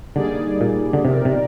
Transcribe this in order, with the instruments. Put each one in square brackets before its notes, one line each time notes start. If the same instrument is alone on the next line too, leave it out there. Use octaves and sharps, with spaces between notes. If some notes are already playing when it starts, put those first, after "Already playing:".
[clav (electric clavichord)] D3 [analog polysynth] G3 A#3 D#4 G#4 D5
[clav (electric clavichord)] A#2
D3
[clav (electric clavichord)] C3 [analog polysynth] F3 C4 D#4 A#4 D5
[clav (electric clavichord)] C3